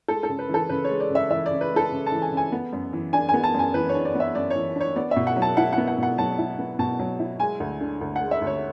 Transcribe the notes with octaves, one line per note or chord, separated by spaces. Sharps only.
G#3 A4
A4
C#3
B4
E3 A4
C#3 B4
C#5
G#3
D5
C#3
E5
E3 E5
C#3 D5
B4
G#3
A4
C#3
A5
E3
G#5
C#3
G#5
B3
F#2
E3
D4 G#5
B3 G#5
A5
F#2
G#5
E3 B4
C#5
D4
D5
B3
E5
F#2 D5
E3 C#5
D4 C#5
B3 D5
E5
B2
F#5
F#3
A5
E4 F#5
F#5
B3
F#5
B2 F#5
F#3 A5
E4
B3
B2 A5
F#3
E4
G#3 G#5
D2
D3
D2
F#5
G#3
E5
D2
C#5